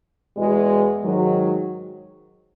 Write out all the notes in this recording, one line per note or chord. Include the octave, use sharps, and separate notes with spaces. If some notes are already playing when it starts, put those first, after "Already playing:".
E2 B2 G#3
G#2 D#3 F#3